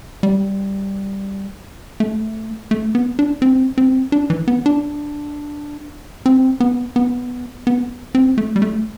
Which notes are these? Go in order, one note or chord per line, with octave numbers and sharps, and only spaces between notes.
G3
A3
A3
B3
D4
C4
C4
D4
E3
B3
D4
C4
B3
B3
B3
C4
A3
G3
A3